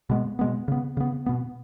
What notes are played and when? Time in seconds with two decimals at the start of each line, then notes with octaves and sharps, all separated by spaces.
0.10 B2 G#3 B3
0.39 B2 G#3 B3
0.68 C#3 B3
0.97 C#3 B3
1.26 B2 B3